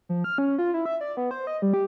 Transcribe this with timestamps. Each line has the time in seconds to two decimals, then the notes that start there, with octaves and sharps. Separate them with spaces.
0.09 F3
0.24 F6
0.38 C#4
0.58 F4
0.74 E4
0.86 E5
1.01 D5
1.17 B3
1.31 C5
1.47 D#5
1.62 G3
1.74 G4